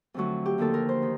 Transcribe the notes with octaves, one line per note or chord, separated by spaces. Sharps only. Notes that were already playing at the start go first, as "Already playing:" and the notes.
F2 D3 F#3 A3 F#4
G4
D#2 D3 F3 A#3 A4
A#4
C5
D#3